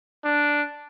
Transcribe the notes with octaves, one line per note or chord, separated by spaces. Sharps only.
D4